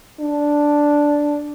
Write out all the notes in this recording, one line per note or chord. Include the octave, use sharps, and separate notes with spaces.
D4